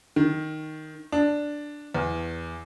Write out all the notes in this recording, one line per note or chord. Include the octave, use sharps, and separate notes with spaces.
D#3
D4
E2